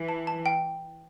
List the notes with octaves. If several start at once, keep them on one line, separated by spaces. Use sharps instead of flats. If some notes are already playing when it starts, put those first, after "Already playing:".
Already playing: E3
A5
A5
G5